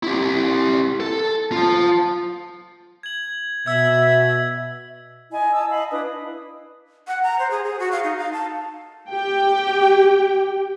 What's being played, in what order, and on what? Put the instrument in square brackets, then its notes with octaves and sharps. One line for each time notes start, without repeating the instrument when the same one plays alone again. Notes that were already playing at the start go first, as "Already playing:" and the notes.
[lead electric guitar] E4 G4
A4
F4 A5
[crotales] G#6 F#7
[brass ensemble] B2 [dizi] E5 [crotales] E6 G#6
[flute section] E4 D#5 G#5
D#5 A5 D#6 E6
D#5 F5 B5
D4 E4 B4 D#6
[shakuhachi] F#5
A#5
C5
G#4
G#4
F#4
F5
D#4
F5
A5
[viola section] G4 G5